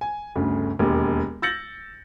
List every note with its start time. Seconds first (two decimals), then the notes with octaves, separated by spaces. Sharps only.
0.01 G#5
0.35 G1 D2 C#3
0.79 E1 D#2
1.42 E6 G6 A6 A#6 C#7 F#7